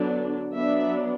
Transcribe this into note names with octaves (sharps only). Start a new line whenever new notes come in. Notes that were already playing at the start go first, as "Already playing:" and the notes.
Already playing: D3 F#3 B3 D4
F#3 B3 D4 E5